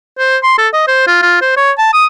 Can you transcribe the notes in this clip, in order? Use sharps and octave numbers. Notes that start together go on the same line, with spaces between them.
C5
C6
A4
D#5
C5
F4
F4
C5
C#5
A5
D#6